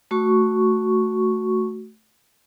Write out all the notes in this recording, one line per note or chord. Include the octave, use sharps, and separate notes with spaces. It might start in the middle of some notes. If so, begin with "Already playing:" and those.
A3 F#4 C#6